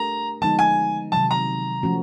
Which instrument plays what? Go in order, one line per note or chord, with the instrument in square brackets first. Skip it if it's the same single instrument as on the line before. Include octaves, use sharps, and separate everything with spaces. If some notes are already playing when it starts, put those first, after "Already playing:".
Already playing: [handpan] A3 D4 G4 A#4 [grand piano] A#5
[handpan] D3 F3 G#3 B3 D#4 [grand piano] A5
[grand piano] G#5
[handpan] C3 D#3 F#3 [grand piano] A5
[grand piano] A#5
[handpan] F3 A3 C#4 F#4